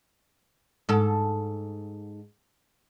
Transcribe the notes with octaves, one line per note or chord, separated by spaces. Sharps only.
G#2 A4